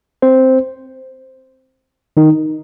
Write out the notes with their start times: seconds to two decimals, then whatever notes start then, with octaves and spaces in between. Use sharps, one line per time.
0.22 C4 C5
2.17 D#3 D#4